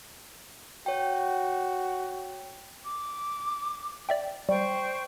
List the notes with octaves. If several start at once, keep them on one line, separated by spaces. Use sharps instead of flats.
F#4 C#5 G5
D6
D5 E5 G5
G3 C5 G5 C#6